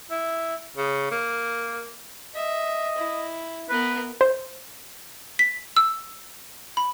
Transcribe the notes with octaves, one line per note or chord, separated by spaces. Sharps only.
E4
C#3
A#3
D#5 E5
E4
B3 A#4 B4
C5
B6
E6
B5